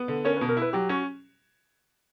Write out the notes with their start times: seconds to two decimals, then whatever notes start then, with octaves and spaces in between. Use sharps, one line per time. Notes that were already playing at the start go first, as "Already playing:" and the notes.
Already playing: B3
0.08 D3
0.25 C#4 A#4 C#5
0.36 B2 B4
0.49 A#4
0.57 E4 B4
0.73 F#3 G4
0.89 C#4 F#4